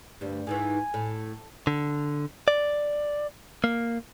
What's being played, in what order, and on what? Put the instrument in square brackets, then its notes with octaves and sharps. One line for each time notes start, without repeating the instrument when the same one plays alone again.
[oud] D2 G3 [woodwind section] G2
[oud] G#2 D#3 E3 [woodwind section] G#5
[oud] A2
[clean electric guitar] D3
D5
A#3